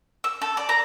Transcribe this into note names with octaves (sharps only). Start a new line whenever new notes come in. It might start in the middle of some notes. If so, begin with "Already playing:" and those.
E6
A4
D5
A#5